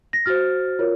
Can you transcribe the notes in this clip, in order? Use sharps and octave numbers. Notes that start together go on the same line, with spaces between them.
A#6
F#4 C5 F6 A6
F4 A#4 C#5